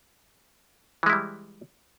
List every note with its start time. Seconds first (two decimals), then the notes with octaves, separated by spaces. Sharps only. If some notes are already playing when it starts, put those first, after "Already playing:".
1.03 E3
1.06 G#3
1.10 E4
1.13 G3